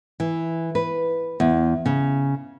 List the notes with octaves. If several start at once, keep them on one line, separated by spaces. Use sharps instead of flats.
E3
B4
E2
C#3